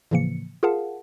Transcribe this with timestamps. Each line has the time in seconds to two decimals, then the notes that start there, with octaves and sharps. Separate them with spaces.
0.11 A2 C#3 E3 F3 A#3 C#7
0.63 F4 G#4 A#4 F5 F#5 A5